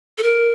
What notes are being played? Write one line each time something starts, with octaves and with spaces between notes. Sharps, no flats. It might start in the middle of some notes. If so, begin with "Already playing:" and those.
A4
A#4